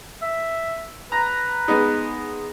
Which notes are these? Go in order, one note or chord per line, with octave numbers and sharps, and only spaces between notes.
E5
B4 A#5
G#3 B3 D#4